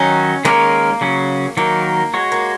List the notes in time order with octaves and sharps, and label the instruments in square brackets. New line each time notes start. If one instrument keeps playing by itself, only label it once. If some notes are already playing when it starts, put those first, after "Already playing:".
Already playing: [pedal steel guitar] D#3 F#3 D#4 [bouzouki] C#4
[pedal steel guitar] D#3 G#3 C#4 A#4 C#5 [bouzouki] A#3
[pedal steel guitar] C#3 F#3 C#4
[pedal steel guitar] D#3 F#3 D#4 A#4 [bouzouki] A#3
[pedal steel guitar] G#3 F#4 C#5
[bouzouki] A#3